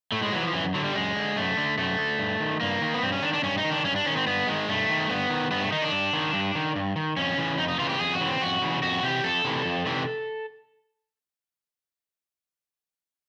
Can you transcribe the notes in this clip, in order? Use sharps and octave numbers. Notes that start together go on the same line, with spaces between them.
A2 A3
G#3
E3 F#3
F3
F#2 E3
D3 F#3
G3
F#2 G#3
D3
F#2 A3
D3
F#2 A3
D3
G2
D#3
G2 A#3
D#3
B3
G2 C4
C#4
D#3 D4
D4
G2 C#4
D#4
D#3
D4
G2 C#4
D4
D#3 C#4
C4
G2 B3
D#3 G#3
G2 A3
D#3
G2 B3
D#3
G2 B3
A3
D#3 D#4
D4
G2
D#3
G2
D#3
G2
D#3
F2 C#4
C#3 E3
F2 D#4
D#4
C#3 E3 F4
G4
F2 G#4
F#4
C#3 E3
C4
F2 F#4
C#3 E3
F2 F#4
C3 E3 G4
F2 A4
C3 E3
F2
C3 E3